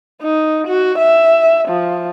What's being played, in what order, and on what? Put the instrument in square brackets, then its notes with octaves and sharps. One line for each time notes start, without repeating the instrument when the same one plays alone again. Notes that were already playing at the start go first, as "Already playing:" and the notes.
[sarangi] D#4
F#4
E5
F3